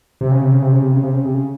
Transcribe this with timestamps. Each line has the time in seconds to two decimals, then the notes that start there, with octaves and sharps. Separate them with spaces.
0.21 C3
0.31 C#3
0.42 C3
0.52 C#3
0.62 C3
0.72 C#3
0.82 C3
0.93 C#3
1.03 C3
1.14 C#3
1.25 C3
1.34 C#3